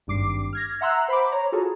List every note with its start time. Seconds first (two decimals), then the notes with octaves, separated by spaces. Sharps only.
0.07 G#1 G2 D6 C7
0.53 F6 G#6 A#6
0.81 E5 F#5 A#5 C6 E6 F#6
1.08 C5 B5 C6 D6
1.32 C#5 A#5
1.52 F4 F#4 G#4 A4